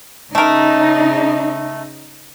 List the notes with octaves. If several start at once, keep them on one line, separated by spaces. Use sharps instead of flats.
C#3 A3 D#4 A#4